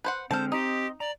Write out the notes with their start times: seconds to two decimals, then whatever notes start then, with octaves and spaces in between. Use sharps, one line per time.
0.04 B4 C5 F#5
0.31 D3 G#3 C4 A4 C5 A5 F6
0.52 D#4 G4 D#5 C6 D#6
1.00 D5 A#5